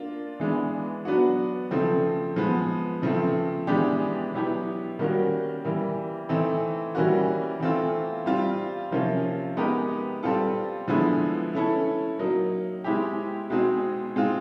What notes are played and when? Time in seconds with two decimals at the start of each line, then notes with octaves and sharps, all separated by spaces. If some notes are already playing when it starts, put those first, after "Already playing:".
Already playing: A#3 D4 F4
0.40 E3 G#3 B3 D4
1.05 F#3 B3 D4 F#4
1.71 C#3 F3 A3 C4
2.36 F3 G#3 B3
3.02 C#3 F3 A3 C4
3.67 E3 G#3 B3 D4 G4
4.34 B2 F#3 B3 E4 G4
4.99 D#3 G3 A#3 C#4 F#4
5.65 E3 G3 A#3
6.29 E3 A3 C4 D#4
6.95 E3 G3 A#3 C#4 F#4
7.60 E3 A3 C4 F4
8.26 G3 C4 F4
8.91 C3 F3 A#3 C#4 F4
9.57 G#3 B3 D#4 G4 A#4
10.23 G3 C4 F4 A4
10.88 D3 F3 G#3 B3 E4
11.53 A3 C#4 E4 A4
12.19 F#3 A#3 D#4
12.84 G#3 C4 E4 G4
13.50 B2 G#3 C4 D#4 G#4
14.16 G#3 C4 F4